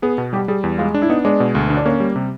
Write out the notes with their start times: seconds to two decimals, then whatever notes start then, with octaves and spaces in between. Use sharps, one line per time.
0.02 B3 G#4
0.18 B2
0.33 G3 G4
0.48 G3 G#4
0.63 E2
0.78 G#3 F4
0.94 D4
1.02 E4
1.09 B3 D#4
1.25 G#3 D4
1.40 B2
1.55 D2
1.70 D3
1.77 D4
1.85 A#3 C#4
2.00 G3
2.16 C3